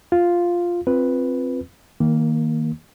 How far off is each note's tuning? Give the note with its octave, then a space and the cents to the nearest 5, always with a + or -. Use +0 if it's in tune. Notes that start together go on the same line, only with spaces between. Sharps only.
F4 +0 F5 +0
C4 +5 F4 +0 B4 +0
D#3 +20 A#3 +0